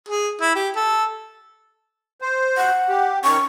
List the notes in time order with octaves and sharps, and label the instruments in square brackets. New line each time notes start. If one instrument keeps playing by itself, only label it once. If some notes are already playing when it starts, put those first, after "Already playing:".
[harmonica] G#4
E4
G4
A4
[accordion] C5
[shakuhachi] F#5
[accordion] G4
[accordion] D#3 C#4 [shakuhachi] C#6